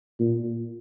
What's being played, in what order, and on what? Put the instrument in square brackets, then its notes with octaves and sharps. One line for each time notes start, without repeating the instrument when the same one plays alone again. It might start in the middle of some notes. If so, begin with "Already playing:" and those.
[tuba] A#2